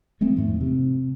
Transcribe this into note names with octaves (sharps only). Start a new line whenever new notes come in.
E3 G#3 A3 C4
E2 G#2 F3 A3
C3 C4